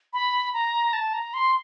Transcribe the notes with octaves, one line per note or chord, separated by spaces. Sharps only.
B5
A#5
A5
A#5
C6